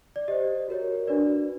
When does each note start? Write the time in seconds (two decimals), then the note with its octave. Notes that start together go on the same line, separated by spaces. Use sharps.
0.16 D5
0.28 G4 C5 D#5
0.68 F#4 A#4 C#5
1.07 D4 F#4 B4 D5